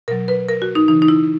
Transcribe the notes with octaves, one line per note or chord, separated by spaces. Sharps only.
B2 F#3 A#4
B4
A#4
F#4
D#4
C#3 E3 D#4
D#4
E4